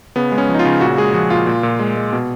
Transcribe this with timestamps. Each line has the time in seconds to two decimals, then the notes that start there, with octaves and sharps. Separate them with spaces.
0.16 C#3 B3
0.32 G#3
0.38 C#4
0.49 F3
0.54 D#4
0.59 F4
0.66 C#3
0.81 A#2 F#4
0.97 G#3 G#4
1.14 F3 F#4
1.30 A#2 F4
1.47 A#2
1.63 A#2
1.79 G#3
1.96 G#3
2.13 B2